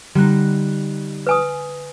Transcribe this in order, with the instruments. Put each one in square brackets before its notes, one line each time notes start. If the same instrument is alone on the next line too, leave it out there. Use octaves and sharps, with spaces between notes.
[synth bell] D3 F#6 [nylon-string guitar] G3 D#4
[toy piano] B4 G#5 D#6